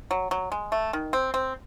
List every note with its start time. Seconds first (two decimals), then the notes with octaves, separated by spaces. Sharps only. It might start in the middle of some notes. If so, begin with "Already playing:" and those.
0.11 F#3
0.31 F#3
0.52 G#3
0.72 A3
0.93 D#3
1.13 C4
1.34 C4